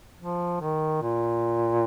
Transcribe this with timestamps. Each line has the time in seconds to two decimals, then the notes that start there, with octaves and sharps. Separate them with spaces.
0.19 F3
0.61 D#3
1.02 A#2